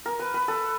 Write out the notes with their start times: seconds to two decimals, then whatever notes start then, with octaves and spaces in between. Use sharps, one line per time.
0.06 A#4
0.19 B4
0.34 B4
0.48 A4